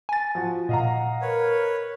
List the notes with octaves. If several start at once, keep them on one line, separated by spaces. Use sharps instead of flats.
G#5 A6
F3 F#4
A#2 D#5 F5 F#5 A#5
A#4 B4 C#5